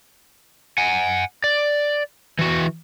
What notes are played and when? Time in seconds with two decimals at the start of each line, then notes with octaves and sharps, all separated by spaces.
0.78 F#5 G#5
1.44 D5
2.39 E3 F#4